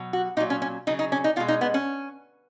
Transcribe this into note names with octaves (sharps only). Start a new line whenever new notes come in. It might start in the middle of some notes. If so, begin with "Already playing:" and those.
Already playing: B2 F#3
F#4
A#2 F#3 D#4
C#4
C#4
C#3 F#3 D#4
D#4
C#4
D#4
B2 G#3 F4
D#4
B3
C#4